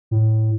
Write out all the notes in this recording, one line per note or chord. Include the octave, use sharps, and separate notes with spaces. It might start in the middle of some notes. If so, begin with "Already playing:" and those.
A2